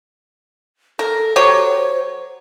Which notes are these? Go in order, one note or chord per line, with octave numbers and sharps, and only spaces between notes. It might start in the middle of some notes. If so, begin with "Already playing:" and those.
A4 A#4
F#3 G4 C5 C#5